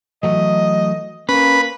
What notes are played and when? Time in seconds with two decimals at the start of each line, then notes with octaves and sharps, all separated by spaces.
0.23 E3 F#3 A3 D#5
1.29 A#3 C#4 B4